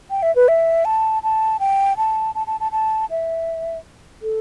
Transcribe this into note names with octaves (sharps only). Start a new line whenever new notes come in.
G5
E5
B4
E5
A5
A5
G5
A5
A5
A5
A5
A5
E5
A4